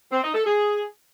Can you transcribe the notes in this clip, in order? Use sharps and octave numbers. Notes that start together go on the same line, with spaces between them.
C4
D#4
A4
G#4